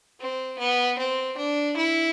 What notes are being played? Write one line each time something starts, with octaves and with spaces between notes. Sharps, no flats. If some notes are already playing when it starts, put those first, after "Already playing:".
C4
B3
C4
D4
E4